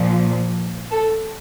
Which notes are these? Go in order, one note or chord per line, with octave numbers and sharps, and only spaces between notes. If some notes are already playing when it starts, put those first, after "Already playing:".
Already playing: A#2 F3
A4